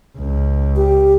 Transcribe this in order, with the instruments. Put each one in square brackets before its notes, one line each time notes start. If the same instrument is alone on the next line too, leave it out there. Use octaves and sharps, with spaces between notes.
[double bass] C#2
[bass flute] G4